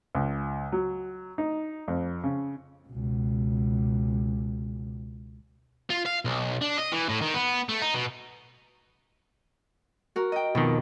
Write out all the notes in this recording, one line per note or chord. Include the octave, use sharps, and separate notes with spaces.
C#2
F#3
D#4
F2
C#3
C#2 B2
F4
F5
B1
D4
D#5
E3
A2
D#3
B3
A3
D#4
B2
F#4 A#4
D#5 G5
F2 B2 D#3